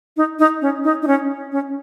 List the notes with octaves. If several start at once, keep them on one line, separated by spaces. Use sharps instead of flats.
D#4
D#4
C#4
D#4
D#4
C#4
C#4